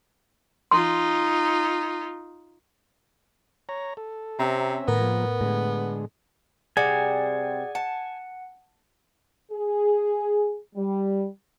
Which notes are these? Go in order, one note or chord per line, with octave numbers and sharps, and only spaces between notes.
D#4 F4 C6
C#5 A#5
A4
C3 C4 C#4 E5 A#5
A2 D#3 B3 A#4
F3 A#3
A2 D3 G#3
C3 G3 C4 G#4 D5 F#5 G#5
F#5 A5
G#4
G3